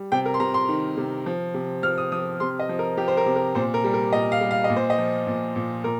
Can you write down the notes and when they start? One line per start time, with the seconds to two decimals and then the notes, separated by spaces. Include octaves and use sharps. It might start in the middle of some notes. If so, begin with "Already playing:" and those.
Already playing: G3
0.12 C3 G5
0.26 A#4
0.34 C6
0.40 C3 A#5
0.54 C6
0.69 D#3
0.97 C3
1.26 F3
1.54 C3
1.83 F3 F6
1.98 D#6
2.12 F3 D#6
2.40 C3 C6
2.59 D#5
2.69 F3
2.79 A#4
2.97 F3 G4
3.08 C5
3.17 A#4
3.26 C3
3.36 A#4
3.55 A#2 C5
3.74 A#4
3.84 G3
3.94 A#4
4.13 A#2 D#5
4.32 F5
4.41 G3
4.51 F5
4.64 D#5
4.70 A#2
4.76 C5
4.90 D#5
4.98 F3
5.27 A#2
5.56 A#2
5.84 A#2 A#4